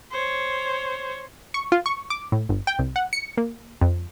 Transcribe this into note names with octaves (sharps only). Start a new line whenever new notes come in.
C5 C#5
C#6
F4
C#6
D6
A2
G1
G5
C2
F#5
C#7
A#3
F2